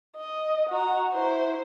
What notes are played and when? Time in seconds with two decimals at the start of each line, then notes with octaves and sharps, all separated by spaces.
0.17 D#5
0.69 F#4 A#5
1.12 E4 C5